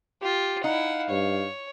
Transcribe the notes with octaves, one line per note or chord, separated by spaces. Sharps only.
F4 G4
D#4 E4 F5 F#5
G2 C#5